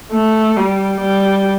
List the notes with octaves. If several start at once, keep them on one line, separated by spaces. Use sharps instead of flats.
A3
G3
G3